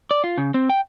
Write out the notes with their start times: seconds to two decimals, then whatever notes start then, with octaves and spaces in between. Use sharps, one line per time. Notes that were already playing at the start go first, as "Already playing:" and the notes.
0.11 D5
0.24 F4
0.38 C#3
0.54 C4
0.70 G5